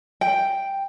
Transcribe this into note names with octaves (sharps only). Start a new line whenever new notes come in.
G5